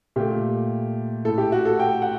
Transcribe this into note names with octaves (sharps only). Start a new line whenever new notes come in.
A#2 A3 G4
A2 A3 A4
G4
F#4
A4
G5
F#5